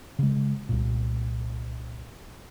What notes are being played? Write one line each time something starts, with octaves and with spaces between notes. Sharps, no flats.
C#3 G#3
C2 A#2